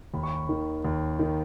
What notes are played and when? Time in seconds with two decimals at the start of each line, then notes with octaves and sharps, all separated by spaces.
0.14 D#2 B5
0.23 C#6
0.34 B5
0.49 D#3
0.84 D#2
1.19 D#3